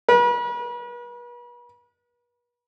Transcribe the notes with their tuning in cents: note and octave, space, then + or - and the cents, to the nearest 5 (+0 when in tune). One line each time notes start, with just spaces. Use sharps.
B4 -40